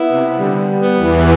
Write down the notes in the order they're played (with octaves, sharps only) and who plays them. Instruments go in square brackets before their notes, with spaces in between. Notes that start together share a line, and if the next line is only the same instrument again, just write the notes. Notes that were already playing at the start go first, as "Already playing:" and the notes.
Already playing: [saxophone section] B3 E4
[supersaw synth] C3
[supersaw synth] D3 [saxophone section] G3
[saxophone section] B3
[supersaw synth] E2 E3